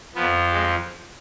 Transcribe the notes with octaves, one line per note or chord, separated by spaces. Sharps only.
F2 F3 B3
G#3